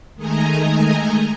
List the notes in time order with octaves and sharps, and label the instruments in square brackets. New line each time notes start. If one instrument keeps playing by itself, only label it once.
[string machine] D#3 G#3 A3 D#5 G#5 A#5